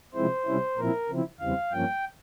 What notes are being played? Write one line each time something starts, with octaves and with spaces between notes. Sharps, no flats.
C3 F3 G#3 C4 E4 C5
C3 G3 C#4 E4
A#2 F3 C4 E4 A#4
C#3 F3 C4 E4
E2 C#3 E3 G3 C4 F5
G2 F3 A#3 C#4 G5